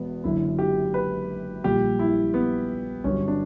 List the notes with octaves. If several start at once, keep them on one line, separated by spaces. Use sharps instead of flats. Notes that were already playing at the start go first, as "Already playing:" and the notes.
Already playing: E1 E2 B3
F#1 F#2 D3 E4
G4
B4
A#1 A#2 G3 G4
E4
B3
G1 G2 F#3 C#4
D4